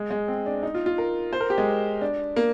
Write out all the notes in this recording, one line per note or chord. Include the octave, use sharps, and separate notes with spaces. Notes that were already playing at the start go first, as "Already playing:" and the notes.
Already playing: G#3
G#3
C4
D4
D#4
F4
F4
A#4
C5
A#4
G4
G#3
D4
A#3